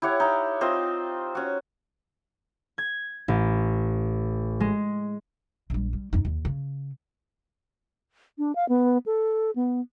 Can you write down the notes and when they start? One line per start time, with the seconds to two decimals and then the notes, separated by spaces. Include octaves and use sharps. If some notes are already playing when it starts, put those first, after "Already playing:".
0.02 E4 G4 C#5 F#5
0.20 D#4 E4
0.61 C4 F4 C5 D#5
1.35 C#4 F#4
2.78 G#6
3.28 A1
4.60 G#3
5.70 A#1 G3
5.93 G3
6.13 F2 D#4
6.25 D#2
6.45 C#3
8.38 D4
8.55 F5
8.69 B3
9.06 A4
9.56 B3